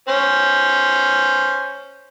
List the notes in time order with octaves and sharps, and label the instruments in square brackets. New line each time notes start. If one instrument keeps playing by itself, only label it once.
[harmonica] C#4 C5